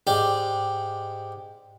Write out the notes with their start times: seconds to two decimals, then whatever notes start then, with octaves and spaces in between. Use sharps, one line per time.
0.07 G#2 G4 D5